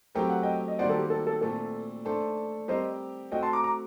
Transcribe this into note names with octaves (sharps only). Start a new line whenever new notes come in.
F#3 A3 C4 G4 A#4 G5
F#5
D#5 G5
D#5
D#3 G3 A#3 F#4 C5 D5 F#5
A4
G4
A4
A4
A#2 A3 C4 A4
A3 D4 A4 C5
G3 C4 G4 A#4 C5 D#5
A3 C4 F#4 D#5 G5
A5 C6
A#5 D6
A#5 D6